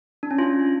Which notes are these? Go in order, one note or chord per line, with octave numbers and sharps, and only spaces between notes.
D4
C#4
F4